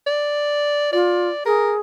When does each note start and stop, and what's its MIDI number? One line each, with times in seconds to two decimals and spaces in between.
0.07 0.92 74
0.93 1.28 65
0.93 1.40 74
1.46 1.80 68
1.46 1.73 70